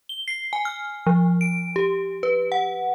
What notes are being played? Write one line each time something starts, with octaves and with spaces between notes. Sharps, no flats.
G7
C7
G#5
F6
F3
D7
G4
B4
F#5